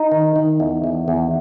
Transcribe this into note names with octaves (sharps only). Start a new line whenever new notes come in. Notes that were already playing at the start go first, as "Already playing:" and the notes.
Already playing: D#4
D#3
D#3
E2
E2
E2